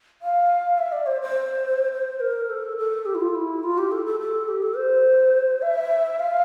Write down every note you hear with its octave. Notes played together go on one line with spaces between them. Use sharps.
F5
E5
D5
C5
C5
C5
A#4
A4
A4
G4
E4
F4
E4
F4
G4
A4
A4
A4
G4
A4
C5
E5
F5